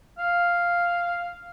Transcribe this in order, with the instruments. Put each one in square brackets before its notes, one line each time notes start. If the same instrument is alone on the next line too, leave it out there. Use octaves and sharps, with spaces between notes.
[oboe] F5